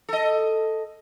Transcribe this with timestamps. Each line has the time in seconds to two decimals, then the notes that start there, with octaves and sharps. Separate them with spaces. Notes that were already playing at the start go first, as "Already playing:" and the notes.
0.09 A4 D#5